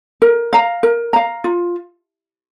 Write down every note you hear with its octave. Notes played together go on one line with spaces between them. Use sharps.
A#4
F5 A#5
A#4
F5 A#5
F4